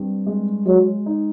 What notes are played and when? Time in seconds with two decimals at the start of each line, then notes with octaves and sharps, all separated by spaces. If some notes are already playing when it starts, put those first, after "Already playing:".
Already playing: G2 C4
0.27 G#3
0.66 F#3 G#3
1.06 D#4